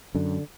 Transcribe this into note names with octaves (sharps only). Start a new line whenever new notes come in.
F#2 D3